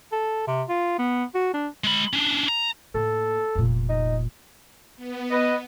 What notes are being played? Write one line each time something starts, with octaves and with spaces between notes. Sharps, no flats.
A4
C3
F4
B3
F#4
D4
G#3 B5
C#4 D4
A#5
A2 A#3 A4
F1 A#2
D#4
B3
B4 D#5